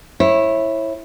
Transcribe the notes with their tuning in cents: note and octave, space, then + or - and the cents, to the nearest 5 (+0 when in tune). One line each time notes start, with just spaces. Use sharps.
E4 +0 C#5 -30